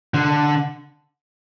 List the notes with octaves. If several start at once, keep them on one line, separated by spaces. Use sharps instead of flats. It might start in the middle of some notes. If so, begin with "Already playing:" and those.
D3